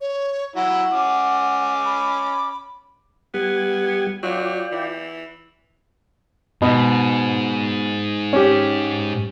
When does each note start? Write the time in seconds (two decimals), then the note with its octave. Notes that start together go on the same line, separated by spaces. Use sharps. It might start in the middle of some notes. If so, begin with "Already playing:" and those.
0.01 C#5
0.56 F#3 E4 F#5
0.93 C#4 D6
1.85 B5
3.34 G3 B3 G4 G#6
4.23 F#3 F4 D5 G5
4.72 E3
6.62 G#2 B2
8.33 C#4 G4